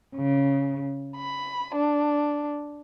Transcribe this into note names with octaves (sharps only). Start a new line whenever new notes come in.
C#3
B5
D4